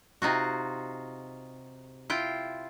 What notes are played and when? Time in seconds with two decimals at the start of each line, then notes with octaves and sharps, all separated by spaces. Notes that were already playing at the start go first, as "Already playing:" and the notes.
0.22 C3 D#4 F4 F#4
2.10 E4 F4 G5